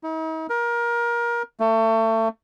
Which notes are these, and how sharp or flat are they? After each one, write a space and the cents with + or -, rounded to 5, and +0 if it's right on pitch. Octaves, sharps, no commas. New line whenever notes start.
D#4 +45
A#4 +25
A3 +30